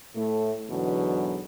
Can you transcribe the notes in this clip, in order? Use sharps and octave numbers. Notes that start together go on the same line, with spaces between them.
A2 A3
E2 G#2 B2 D3 E3 F#3